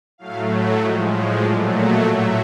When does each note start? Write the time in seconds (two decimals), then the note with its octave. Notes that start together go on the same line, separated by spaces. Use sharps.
0.18 A2 F#3 A3 F5
0.81 A2 F3 G#3 D#5
1.13 C#5
1.45 A#2 F#3 A3 D5
1.76 D#5
2.08 A2 F#3 A3 E5